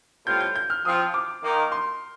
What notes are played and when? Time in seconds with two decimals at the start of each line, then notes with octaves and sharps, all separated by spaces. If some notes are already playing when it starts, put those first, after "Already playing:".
0.26 A2 G3 C4 F4 G6
0.40 G6
0.56 G6
0.70 F6
0.85 F3 C4 F4 D#6
1.14 D6
1.43 D#3 A#3 D#4
1.72 C6